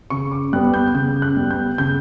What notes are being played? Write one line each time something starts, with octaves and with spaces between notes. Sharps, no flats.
C#3 C#6
D6
G3 B3 F#6
G6
C#3 G6
F#6
G3 B3
G6
C#3 G6